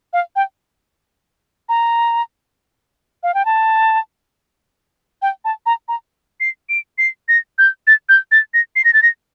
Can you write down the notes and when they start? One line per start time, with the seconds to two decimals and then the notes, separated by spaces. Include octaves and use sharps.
0.13 F5
0.36 G5
1.69 A#5
3.23 F5
3.34 G5
3.45 A5
5.22 G5
5.45 A5
5.66 A#5
5.88 A#5
6.40 C7
6.69 D7
6.98 C7
7.28 A#6
7.58 G6
7.87 A6
8.09 G6
8.32 A6
8.54 A#6
8.76 C7
8.85 A#6
8.93 A6
9.03 A#6